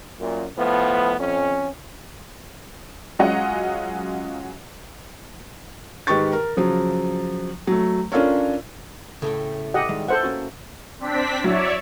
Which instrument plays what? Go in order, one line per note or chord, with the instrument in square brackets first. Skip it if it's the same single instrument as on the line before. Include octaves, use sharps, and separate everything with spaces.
[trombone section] F#2 A#2
A2 F3 B3
F2 C#4
[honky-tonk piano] F#3 G#3 C#4 F4 D#5 F#5
[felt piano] G#2 D#3 G4 B4 C#6 A6
A#4
C#3 F3 F#3
F#3 A3
C#4 D4 F4 A4 A#4 C#5
[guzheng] A2 A3 G5 [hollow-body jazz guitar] C#3
[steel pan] G4 D#5 F#5
[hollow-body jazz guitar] D#3 G3 G#3
[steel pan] A4 C5 F#5 [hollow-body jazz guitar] E5
[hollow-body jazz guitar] A#3 C#4 F#4
[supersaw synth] C4 D4 B6
[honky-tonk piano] F#3 E4 [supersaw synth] C#5 D5 E5